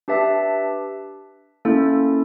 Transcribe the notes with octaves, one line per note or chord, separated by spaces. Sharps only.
D4 G4 B4 E5 A5
A#3 C#4 E4 A4